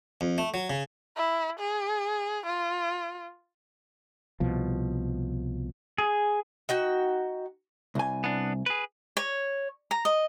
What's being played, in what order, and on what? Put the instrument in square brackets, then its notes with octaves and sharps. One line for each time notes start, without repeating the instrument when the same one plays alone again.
[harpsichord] F2
A3
F#3
C#3
[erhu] E4
G#4
F4
[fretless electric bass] C2 B2 F3
[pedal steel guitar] G#4
[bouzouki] D#4 F#4 G5
[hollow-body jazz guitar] C2 G#5
[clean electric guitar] B3 D4
G#4 B4
[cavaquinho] C#5
A#5
D#5